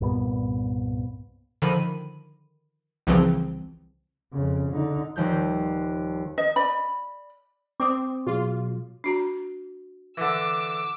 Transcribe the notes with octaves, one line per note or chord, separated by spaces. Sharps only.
C2 G2 A#2 B3
D3 D#3 F3 B5 D#7
C2 C#3 E3 F3 C4
F2 C#3
D3 D#4
D#1 D#2 F3 G6
D#5
D5 B5
C4 D6 D#6
B2 F#3 F4 G#4
D4 F#4 A#5
D3 E3 D6 E6